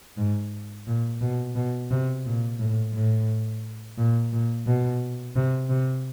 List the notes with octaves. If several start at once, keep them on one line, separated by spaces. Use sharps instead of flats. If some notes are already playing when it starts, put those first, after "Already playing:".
G#2
A#2
B2
B2
C3
A#2
A2
A2
A#2
A#2
B2
C3
C3